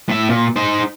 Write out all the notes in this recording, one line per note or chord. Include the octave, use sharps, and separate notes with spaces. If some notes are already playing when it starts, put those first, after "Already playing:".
A2 E5
A#2
D#4 C5